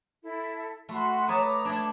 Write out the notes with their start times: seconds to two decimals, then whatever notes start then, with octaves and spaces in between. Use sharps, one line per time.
0.22 E4 A4
0.89 A3 F#4 B5 C6
1.28 B4 C#5 A5 A#5 D6 D#6
1.65 A3 D4 A5 D6 G#6